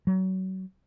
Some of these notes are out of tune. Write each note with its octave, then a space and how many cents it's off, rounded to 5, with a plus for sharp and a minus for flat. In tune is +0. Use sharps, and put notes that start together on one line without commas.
F#3 +30